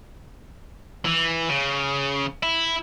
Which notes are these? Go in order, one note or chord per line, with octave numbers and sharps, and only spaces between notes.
E3
C#3
E4